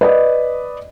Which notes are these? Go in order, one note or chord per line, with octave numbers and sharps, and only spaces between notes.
B4 D5 D#5